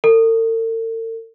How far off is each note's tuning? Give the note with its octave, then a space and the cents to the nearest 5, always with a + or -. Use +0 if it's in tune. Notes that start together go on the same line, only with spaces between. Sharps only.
A4 +45